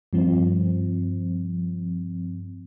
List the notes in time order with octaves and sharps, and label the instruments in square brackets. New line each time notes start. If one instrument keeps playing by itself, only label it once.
[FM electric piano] G2 F3 C4